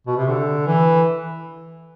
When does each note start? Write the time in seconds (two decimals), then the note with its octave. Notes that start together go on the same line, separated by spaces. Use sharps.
0.07 B2
0.17 C3
0.28 D3
0.66 E3